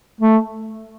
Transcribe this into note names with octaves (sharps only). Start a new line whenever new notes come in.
A3